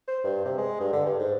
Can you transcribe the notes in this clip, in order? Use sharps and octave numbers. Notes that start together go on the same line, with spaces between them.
C5
G2
C3
G#3
G2
D3
G2
G#2